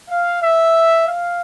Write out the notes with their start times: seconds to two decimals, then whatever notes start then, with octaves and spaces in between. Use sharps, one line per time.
0.09 F5
0.41 E5
1.07 F5